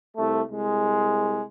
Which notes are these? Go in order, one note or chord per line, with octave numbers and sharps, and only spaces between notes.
C2 A3
C2 G#3